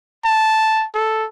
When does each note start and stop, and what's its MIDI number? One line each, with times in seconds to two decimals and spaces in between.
0.25 0.85 81
0.95 1.25 69